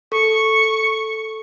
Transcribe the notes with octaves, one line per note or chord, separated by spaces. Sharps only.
A4 C#6